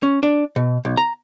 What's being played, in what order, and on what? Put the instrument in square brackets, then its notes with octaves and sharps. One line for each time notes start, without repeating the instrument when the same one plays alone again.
[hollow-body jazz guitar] C#4
D4
B2
B1
A#5